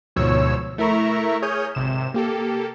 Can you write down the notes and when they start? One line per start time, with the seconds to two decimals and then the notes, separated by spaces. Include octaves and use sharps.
0.16 D2 G#2 B2 F3 C#5 E6
0.78 A3 E4 A#4 E5 A#5 C#6
1.42 G#4 C#5 D#6 F6 G6
1.75 G#1 C3 E7
2.14 A#3 G4 A4